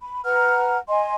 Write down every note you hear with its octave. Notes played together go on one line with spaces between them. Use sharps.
B5
B4 F#5 A#5 F6
D#5 G#5 C6